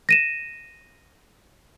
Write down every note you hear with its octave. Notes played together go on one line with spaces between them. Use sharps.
A#6 D#7 E7